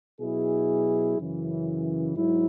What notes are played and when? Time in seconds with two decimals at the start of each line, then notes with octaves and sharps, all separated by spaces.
0.20 B2 F#3 E4 G#4
1.18 F#2 C#3 E3
2.15 G#2 F#3 E4